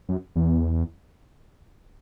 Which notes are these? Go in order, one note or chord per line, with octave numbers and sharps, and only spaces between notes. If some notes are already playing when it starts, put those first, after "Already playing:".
F#2
E2